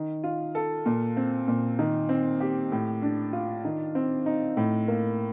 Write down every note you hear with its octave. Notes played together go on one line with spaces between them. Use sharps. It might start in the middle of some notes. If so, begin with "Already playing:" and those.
Already playing: D#3
F4
A4
A#2
C4
A#2
D#3
C4
G4
A2
D4
F4
D#3
C4
D#4
A2
A#3